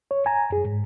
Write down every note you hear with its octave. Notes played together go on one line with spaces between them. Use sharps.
C#5
G#5 A#5
F#2 G#4
G#2